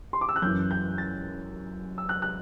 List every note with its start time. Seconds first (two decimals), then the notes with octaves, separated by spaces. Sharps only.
0.13 C6
0.21 D6
0.29 E6
0.36 F#6
0.42 F#2 E3 G6
0.71 G6
0.98 A6
1.98 E6
2.09 F#6
2.22 F#6